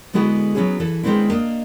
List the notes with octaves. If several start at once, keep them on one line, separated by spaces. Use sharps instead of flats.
D3 G#3 B3 E4 F#4 G#4
F#3 G3 B3 C#4 E4 G#4
E3 A4
D#3 G#3 B3 C4 D4 E4
A#3 D4 D#5